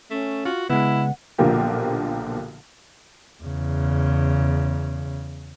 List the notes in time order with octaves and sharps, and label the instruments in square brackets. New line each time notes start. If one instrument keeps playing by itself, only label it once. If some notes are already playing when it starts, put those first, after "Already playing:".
[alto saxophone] A3 [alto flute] C#4
[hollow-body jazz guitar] F4 [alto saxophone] F#4
[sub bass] C#3 [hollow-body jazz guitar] G#3 B3 [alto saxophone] E4 [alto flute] F#5
[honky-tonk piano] B1 A#2 D3 F3 A#3 G4
[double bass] E2 C#3